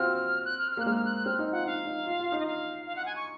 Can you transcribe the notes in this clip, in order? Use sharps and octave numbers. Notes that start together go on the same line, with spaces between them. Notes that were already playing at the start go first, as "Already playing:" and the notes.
Already playing: C4 F4 F#4 F6
F#6
F6
F6
A#3 F#6
G#3 F6
F6
F#6
F#6
C4 F6
D#4
F4 F#5
D#4 F5
D#4
F4
F4
D#4
D#5
F5
F5
F#5
G#5
C#6